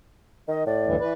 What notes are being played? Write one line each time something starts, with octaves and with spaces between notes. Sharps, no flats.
D#3 D#5
A2 D5
D2 G2 E3
E3 B4